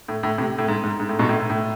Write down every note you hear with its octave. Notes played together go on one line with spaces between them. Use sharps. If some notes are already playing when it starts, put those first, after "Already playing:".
A2
A2
A2 C3
A2
G#2
G#2
G#2
A2
G#2 B2
A2
A2
A2